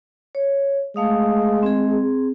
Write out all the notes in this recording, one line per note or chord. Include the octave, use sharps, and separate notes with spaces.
C#5
G#3 A3 F5 D#6
C4 G#4